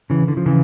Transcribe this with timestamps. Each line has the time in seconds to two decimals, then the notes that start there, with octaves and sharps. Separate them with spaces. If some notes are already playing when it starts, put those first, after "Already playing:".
0.10 C#3 E3
0.28 D3
0.37 F3
0.46 C#3 E3